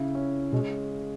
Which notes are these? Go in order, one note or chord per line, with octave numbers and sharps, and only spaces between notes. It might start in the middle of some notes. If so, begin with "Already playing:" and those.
Already playing: C#3 E4
C#4
B2 G#3